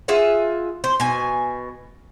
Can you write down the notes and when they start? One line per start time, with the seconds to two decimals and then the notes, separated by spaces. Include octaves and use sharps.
0.08 F4 G#4 E5 F#5
0.84 C5
1.00 B2 G#5